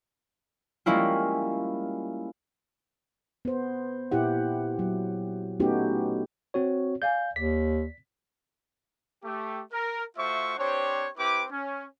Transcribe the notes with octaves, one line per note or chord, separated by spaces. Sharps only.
G3 G#3 A#3 C#4 E4 F4
B3 C5
A#2 E4 G4 F#5
F#3
A3 B3 C#4 D#4 F#4 G4
C4 F#4 C#5
D5 F5 G#5 G6
D#2 D5 B6
A3 G4
A#4
A3 F4 F#4 C5 E5 C#6
C4 D4 G4 C5 C#5
C4 E4 G4 B4 D6
C#4